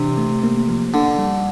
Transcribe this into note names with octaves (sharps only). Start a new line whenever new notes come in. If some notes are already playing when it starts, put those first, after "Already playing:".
Already playing: C3 E3 D4
A3
A#3
F3
D3 D4
G3